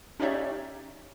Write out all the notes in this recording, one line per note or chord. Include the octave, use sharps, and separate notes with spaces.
C#4 D#4 G4 C#5 D5 E5